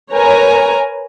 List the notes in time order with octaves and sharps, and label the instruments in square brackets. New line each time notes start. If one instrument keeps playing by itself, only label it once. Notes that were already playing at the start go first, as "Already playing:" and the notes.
[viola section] A#4 B4 C#5 G#5 A#5